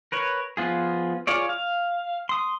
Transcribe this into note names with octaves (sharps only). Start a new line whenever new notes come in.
A#4 B4 C#5
F3 B3 F4 G#4
F4 G#4 C#5 D5
F5
C6 D#6